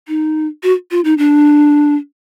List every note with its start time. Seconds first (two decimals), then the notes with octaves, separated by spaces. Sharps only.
0.08 D#4
0.63 F#4
0.91 F4
1.04 D#4
1.18 D4